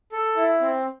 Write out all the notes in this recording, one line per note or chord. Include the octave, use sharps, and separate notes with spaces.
A4
E4
C4